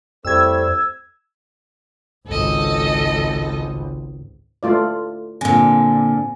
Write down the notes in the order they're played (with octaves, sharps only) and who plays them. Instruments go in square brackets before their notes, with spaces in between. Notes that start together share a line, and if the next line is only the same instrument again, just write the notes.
[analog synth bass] F2 [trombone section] G3 A3 E4 [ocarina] C5 [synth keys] E6 G#6
[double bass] G#1 C#2 [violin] A4 D#5
[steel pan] A3 F4 D5
[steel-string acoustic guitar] A#2 D3 [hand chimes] C4 G#5 A#6